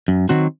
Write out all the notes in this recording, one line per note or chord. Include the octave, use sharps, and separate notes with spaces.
F#2
D#3 F#3 C4 F#4